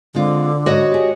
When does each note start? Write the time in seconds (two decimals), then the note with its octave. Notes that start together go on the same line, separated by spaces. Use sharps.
0.15 D3 G#3 C4 F4
0.66 G#2 F#4 C#5 D#5
0.92 G4 G#4